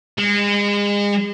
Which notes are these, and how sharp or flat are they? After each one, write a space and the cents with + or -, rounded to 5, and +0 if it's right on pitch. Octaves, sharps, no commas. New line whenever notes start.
G#3 -35